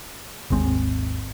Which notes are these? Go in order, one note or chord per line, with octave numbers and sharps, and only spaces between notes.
G#1 D#2 G#3 C4